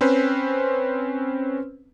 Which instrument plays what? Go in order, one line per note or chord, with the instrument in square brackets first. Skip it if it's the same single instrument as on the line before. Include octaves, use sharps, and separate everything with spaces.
[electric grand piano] C4 C#4 B4 C5